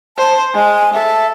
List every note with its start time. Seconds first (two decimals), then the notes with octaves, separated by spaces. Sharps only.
0.18 C5 A5
0.54 G#3 G#5
0.93 A4 E5